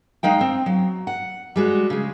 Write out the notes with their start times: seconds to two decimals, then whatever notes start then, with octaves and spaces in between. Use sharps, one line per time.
0.23 G#3 D#4 F5 G5
0.41 C4
0.66 F#3
1.07 F#5
1.56 G3 G#3 F#4
1.90 C#3 G#3